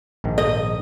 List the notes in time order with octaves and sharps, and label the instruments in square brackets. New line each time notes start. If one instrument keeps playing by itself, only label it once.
[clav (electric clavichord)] A#1 G#2 D#3
[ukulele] D#5